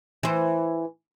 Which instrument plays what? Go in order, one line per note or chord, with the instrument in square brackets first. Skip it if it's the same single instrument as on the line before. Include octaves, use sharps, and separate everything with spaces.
[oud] E3 C5